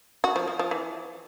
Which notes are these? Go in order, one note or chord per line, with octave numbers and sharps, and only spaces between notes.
F#4
F3
F3
F3
E3